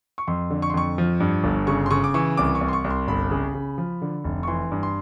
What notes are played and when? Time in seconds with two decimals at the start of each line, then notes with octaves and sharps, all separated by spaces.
0.18 C#6
0.28 F2 C6
0.50 D3
0.62 C#6
0.70 C6
0.74 F2 C#6
0.98 F3
1.20 G2
1.44 G1
1.67 C#3 C#6
1.86 C6
1.91 C#3 C#6
2.04 D6
2.14 E3 C#6
2.37 C2 D6
2.55 C#6
2.61 C2
2.68 C6
2.73 C#6
2.84 C2
2.90 C6
3.08 G1 B5
3.31 C#3
3.54 C#3
3.78 F3
4.02 D3
4.24 F1
4.43 C#6
4.48 E3 C6
4.72 G2
4.83 C6